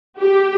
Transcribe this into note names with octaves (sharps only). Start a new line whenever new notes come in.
G4